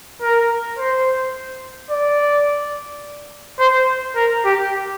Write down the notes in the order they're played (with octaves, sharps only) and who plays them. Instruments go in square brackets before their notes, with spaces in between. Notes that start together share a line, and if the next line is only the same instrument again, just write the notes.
[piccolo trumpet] A#4
C5
D5
C5
A#4
G4